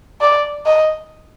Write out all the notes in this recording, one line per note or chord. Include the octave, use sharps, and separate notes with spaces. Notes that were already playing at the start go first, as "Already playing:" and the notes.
D5
D#5